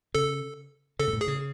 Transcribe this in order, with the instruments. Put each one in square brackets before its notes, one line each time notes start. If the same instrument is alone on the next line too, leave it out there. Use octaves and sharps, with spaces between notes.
[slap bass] C#3 [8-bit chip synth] A4
[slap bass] C#3 [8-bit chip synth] A4
[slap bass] G#2
A2
[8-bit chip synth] G#4
[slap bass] C#3